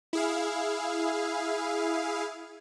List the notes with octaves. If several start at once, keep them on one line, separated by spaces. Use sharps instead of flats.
E4 G#4 F5